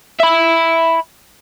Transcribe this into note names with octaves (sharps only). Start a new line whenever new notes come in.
E5 B5